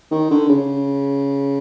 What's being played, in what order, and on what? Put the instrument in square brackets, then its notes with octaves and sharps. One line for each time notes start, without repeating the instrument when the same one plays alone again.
[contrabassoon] D#3
D3
C#3